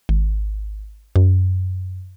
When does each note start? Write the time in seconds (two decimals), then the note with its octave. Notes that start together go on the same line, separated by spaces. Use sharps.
0.09 G#1
1.16 F#2